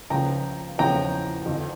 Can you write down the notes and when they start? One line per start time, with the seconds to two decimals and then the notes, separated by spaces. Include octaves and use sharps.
0.10 C#2 C#3 F3 G5 A#5
0.78 E2 C#3 F3 G5 A#5
1.46 F2 D3 F3